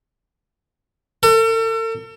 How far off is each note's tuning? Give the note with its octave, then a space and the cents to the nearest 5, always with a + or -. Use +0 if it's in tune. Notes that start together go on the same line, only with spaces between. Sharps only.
A4 +40